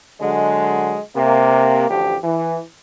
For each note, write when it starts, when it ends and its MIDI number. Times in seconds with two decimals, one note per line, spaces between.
0.21 0.99 50
0.21 0.99 54
0.21 0.99 56
1.16 1.86 48
1.16 1.86 58
1.90 2.16 33
1.90 2.16 38
1.90 2.16 53
1.90 2.16 67
2.24 2.61 52